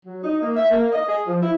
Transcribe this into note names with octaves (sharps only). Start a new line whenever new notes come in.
F#3
D#4
A#3
E5
A#3
D#5
G#4
F3
E4